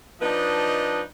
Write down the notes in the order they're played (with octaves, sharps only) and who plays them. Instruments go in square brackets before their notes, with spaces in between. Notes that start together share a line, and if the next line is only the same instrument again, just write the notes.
[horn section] F3 D4 D#4 B4 D#5